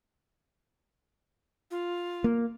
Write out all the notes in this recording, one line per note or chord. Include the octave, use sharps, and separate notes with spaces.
F4
A#3